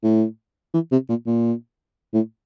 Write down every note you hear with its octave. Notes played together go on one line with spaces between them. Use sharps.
A2
E3
C3
A#2
A#2
A2